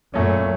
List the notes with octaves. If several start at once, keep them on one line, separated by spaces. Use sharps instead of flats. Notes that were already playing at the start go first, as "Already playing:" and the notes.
F#2 A#2 A3 C#4